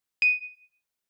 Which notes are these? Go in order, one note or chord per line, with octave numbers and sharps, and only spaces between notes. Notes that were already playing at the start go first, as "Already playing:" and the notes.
D#7